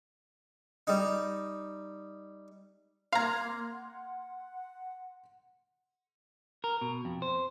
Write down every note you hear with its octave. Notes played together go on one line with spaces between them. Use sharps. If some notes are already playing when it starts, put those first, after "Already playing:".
G3 D#4
A#3 F5 A#5 C6 F6 G#6
F#5
A#4
B2
F2
C5